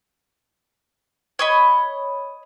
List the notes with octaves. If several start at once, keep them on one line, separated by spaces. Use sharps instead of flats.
C#5 D#5 B5